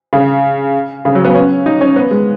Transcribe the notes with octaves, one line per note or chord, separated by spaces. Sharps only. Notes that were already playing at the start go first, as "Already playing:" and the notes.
C#3
C#3
F#3
B3
C#4
D#4
C#4
B3
G#3